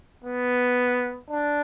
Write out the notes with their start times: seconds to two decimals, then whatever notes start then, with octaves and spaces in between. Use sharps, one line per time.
0.24 B3
1.30 D4